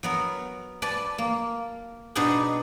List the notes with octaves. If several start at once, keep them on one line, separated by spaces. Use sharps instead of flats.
F#3 B3 A#4
B4 D5 G#5 A5
A#3
B2 B3 D4 D#4 G#4 B4